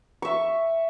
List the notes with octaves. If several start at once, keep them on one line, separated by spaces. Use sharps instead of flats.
E5 C#6